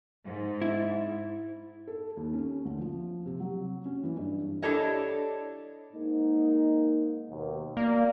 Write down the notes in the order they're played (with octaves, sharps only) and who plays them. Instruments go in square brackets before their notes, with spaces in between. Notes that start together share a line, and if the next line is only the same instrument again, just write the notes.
[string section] G#2
[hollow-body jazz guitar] E4
[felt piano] A4
D#2
C#4
D2
F3
C3
F#3
C#4
E3
G2
[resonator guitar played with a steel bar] D4 E4 G4 A4 C#5 D#5
[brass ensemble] G#2 A#3 D#4
D#2 B2
[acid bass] A#3 [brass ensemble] D5